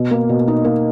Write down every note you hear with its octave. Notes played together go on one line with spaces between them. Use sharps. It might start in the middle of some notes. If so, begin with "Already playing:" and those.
Already playing: B2
A#3
B2
D#4
A#3